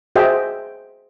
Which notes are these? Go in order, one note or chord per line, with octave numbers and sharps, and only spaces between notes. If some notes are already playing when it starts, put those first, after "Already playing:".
F#4 G#4 C5 D#5 E5 G5